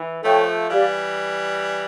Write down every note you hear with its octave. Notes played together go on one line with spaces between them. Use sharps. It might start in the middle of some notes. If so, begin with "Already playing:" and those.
Already playing: E3
F3 A3 A4 C#5 G5 C#6
E3 G3 G4 D5 F5